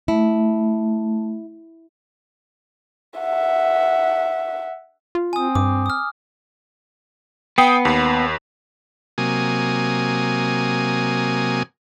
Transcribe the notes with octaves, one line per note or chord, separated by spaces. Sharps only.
A3 E4
E5 F#5
F4
C4 G#5 D#6
G2 D6
D#6 F6
B3 G5 D#6 C7
D#2
C3 F#3 A#3 G#5 D#6